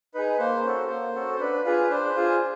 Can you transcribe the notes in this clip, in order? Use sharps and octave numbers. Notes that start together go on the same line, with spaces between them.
D#4 G#4 B4
A#3 C5
C#4 F#4 A4
A#3
C#4 F#4 A4
C5
D4 B4
F4 G#4 B4
D4 C5
F4 G#4